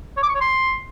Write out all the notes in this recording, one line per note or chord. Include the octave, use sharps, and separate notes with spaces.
C#5
D6
C#6
C#5
C6